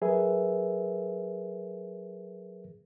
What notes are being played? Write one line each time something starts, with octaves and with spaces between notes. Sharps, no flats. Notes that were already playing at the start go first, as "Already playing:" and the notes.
F#3 G#4 A#4 B4 E5